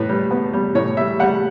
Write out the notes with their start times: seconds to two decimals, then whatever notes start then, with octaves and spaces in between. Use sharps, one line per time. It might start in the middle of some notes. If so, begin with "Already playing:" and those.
Already playing: A2 B4
0.09 G3
0.31 B3
0.53 G3
0.75 A2 C#5
0.97 G3 E5
1.19 G3 F#5